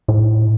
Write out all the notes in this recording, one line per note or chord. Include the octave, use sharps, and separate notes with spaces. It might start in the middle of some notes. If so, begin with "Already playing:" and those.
A2